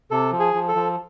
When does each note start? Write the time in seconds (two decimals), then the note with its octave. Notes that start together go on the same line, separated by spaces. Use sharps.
0.11 C3 A4
0.32 F3
0.40 G#4
0.54 F3
0.68 A4
0.76 F3